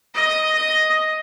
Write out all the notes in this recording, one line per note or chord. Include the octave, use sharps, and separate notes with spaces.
D#5
D#5